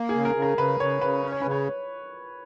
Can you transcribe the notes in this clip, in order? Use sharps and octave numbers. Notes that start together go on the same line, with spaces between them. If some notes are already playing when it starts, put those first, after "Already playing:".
Already playing: A#3
G#4
C#3
A#4
C#3
A#4
C#3 B4
C#3 C#5
C#3 B4
C#4
C#5
C#3 B4
C#5